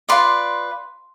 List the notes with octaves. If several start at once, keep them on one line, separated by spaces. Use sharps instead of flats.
F4 B4 D5 C6